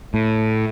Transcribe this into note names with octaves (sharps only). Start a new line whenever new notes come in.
A2